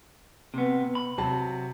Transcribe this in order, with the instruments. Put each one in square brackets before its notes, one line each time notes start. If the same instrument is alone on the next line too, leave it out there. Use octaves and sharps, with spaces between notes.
[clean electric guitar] C3 B3
B5
[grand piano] C3 F#3 A5